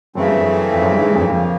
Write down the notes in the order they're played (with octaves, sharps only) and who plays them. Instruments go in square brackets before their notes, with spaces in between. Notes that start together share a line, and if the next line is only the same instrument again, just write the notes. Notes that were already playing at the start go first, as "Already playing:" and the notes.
[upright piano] F#2 [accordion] C#3 E3 A3 C4
[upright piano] G2
F#2
F2
F#2
G2
G#2
G2
F2
F#2
[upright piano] F2 [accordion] C#3 F3 A#3